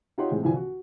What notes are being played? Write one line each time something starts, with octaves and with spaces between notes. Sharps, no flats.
D#4 F4 G4 C#5 F#5 C6
A2 E3 G#3 C4
C2 D3 E3 F3 D4 G#5
F#4